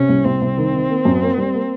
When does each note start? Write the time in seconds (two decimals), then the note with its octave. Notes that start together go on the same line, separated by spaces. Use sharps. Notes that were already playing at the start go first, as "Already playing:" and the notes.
Already playing: C3 C#4
0.09 C2
0.25 C2 C4
0.41 C2
0.57 D#3
0.74 D#3
0.89 A#3
1.05 F#2
1.22 A#3
1.38 G3
1.54 A#3